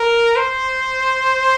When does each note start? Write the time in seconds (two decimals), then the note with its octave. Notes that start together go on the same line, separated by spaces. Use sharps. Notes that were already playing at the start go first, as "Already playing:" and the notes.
Already playing: A#4
0.36 C5